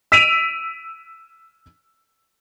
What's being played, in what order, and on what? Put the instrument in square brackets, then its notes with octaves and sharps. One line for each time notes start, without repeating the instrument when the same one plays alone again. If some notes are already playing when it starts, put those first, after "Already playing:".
[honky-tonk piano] E6 B6 D7 D#7 F7